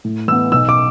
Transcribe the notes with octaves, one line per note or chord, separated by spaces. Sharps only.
A2
E3 B3 E6
B1 E6
D6